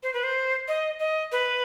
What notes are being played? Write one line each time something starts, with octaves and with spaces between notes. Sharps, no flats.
C5
B4
C5
D#5
D#5
B4